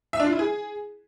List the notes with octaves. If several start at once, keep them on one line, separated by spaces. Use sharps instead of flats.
E5
D4
F4
E4
G#4